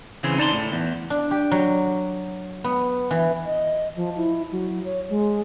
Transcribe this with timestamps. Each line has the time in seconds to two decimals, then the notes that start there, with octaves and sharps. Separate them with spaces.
0.24 C#3 E3 C4 G#4
0.38 D#4 D5 A5 A#5 C6
0.53 A2
0.72 E2
1.10 D4
1.31 G4
1.51 F#3
2.64 B3
3.11 E3
3.46 D#5
3.96 F3
4.16 E4
4.52 F#3
4.85 C#5
5.10 G#3